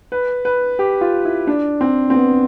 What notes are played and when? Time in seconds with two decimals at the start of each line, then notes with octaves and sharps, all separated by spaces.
0.12 B4
0.45 B4
0.79 G4
1.01 F4
1.25 E4
1.47 D4
1.81 C4
2.10 C4
2.14 B3